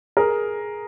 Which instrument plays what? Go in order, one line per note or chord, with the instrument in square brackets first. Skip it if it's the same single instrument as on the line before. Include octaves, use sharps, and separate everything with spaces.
[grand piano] G#4 A#4